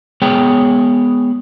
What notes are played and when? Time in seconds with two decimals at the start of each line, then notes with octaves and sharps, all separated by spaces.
0.22 G#3 B3 G#4 C#5 G5